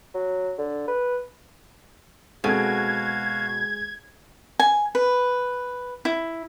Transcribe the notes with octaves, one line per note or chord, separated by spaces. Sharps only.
F#3
D3
B4
B2 G#3 C4 F#4 A4 F5 G#6
G#5
B4
E4